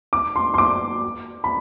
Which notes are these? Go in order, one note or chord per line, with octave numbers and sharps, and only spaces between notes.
D6
C6
C6
D6
B5